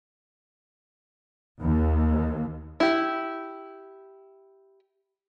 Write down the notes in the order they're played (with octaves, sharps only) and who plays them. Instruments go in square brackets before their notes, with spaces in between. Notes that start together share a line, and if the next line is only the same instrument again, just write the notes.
[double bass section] D#2
[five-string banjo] E4 G4